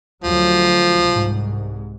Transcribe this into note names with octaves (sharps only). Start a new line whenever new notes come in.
D2 F3 F#3
C2 G#2